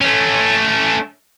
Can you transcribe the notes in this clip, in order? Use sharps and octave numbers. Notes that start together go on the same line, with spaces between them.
A3 C#4